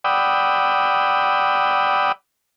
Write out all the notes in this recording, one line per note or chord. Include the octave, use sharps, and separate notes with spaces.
D5 F#5 G5 B5 D#6 E6